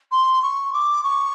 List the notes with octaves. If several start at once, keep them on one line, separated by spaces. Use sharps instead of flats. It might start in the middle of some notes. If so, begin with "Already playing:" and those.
C6
C#6
D6
C#6